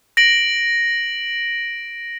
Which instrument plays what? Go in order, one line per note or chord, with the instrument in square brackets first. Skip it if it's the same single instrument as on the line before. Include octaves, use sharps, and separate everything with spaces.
[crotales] A#6 D7 F#7